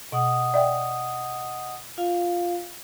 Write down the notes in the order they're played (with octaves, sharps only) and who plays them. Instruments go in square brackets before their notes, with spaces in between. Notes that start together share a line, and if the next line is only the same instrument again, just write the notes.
[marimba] B2 [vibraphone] D#5 F#5 D#6
[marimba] D5 E5 G5
[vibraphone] F4 F5